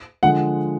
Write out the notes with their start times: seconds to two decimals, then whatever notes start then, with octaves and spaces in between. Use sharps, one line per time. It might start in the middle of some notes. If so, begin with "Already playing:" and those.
0.23 D3 F3 G#3 F#5